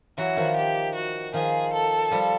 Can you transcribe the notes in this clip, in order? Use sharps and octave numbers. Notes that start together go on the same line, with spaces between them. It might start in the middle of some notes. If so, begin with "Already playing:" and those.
E3 F#3 F#4
D#3 F3
G4
F#4
D#3 F3 G#4
A4
F3 G3